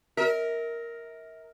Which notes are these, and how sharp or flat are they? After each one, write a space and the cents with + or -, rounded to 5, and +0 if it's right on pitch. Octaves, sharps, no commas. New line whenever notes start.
A#4 +0 E5 -40